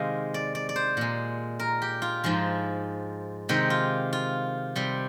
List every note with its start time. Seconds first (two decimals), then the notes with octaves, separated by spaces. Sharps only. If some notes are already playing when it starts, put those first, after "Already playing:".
Already playing: C3 D#3 G#3 F5
0.34 D5
0.55 D5
0.69 D5
0.76 C5
0.97 A#2 G#3
1.60 A#4
1.82 G4
2.02 F4
2.24 G#2 F3 G#3
3.49 C3 D#3 G#3 G4
3.70 F4
4.13 F4
4.76 C3 G3